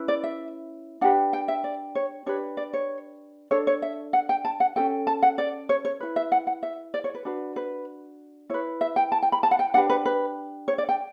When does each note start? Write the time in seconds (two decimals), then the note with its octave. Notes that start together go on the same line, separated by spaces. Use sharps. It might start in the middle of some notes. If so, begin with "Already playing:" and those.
Already playing: C#4 E4 B4
0.08 D5
0.24 E5
1.01 D4 G4 B4 F#5
1.33 G5
1.48 E5
1.64 D5
1.95 C#5
2.26 D4 G4 B4 C#5
2.57 D5
2.73 C#5
3.51 D4 A4 C#5
3.67 C#5
3.82 E5
4.13 F#5
4.29 G5
4.45 A5
4.60 F#5
4.76 C#4 F#4 A4 G5
5.07 A5
5.23 F#5
5.38 D5
5.69 C#5
5.85 C#5
6.00 E4 B4
6.16 E5
6.32 F#5
6.47 F#5
6.63 E5
6.94 D5
7.04 C#5
7.15 B4
7.25 D4 F#4 B4
7.56 B4
8.50 E4 C#5
8.54 B4
8.81 E5
8.96 G5
9.12 A5
9.22 G5
9.32 B5
9.43 A5
9.51 F#5
9.59 G5
9.74 D4 G4 B4 F#5
9.90 B4
10.05 B4
10.68 C#5
10.78 D5
10.89 G5